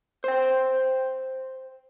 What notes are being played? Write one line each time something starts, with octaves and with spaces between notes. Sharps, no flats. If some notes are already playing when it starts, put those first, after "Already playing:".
C5 G5